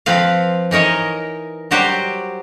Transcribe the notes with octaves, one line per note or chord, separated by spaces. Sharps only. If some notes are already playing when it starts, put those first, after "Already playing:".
F3 C4 B4 F5
E3 D#4 A#4 C#5 D#5
F#3 G3 F#4 G4 C5